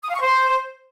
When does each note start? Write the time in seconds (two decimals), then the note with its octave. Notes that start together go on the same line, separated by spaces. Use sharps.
0.02 D#6
0.08 F5
0.14 C#6
0.20 C5